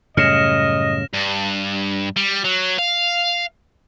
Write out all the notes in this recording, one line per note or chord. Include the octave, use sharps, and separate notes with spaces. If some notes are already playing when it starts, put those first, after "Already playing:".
F#2 A2 C#3 G3 D#5 F6 A#6 E7
G2
G3
F#3
F5